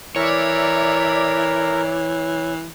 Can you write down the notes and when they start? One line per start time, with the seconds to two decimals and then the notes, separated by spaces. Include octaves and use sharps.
0.16 E3 A#4 C#5 D5 E5 A#5